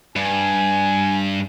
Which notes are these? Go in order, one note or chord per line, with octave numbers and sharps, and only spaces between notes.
G2 G#5